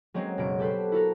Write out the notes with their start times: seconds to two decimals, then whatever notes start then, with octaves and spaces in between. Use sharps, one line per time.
0.14 F#3 G#3 A#3 C4 C#4
0.38 F#1 B2 D7
0.59 G4 A4 B4 C5
0.92 E4 F#4 A4 A#4